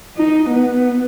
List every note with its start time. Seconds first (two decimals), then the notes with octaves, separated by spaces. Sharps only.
0.17 D#4
0.49 B3